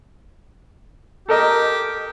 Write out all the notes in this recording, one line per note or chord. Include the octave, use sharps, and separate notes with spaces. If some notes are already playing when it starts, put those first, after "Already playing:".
G4 A4 A#4 D#5